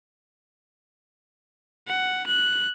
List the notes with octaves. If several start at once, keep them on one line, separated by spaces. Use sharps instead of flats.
F#5
F#6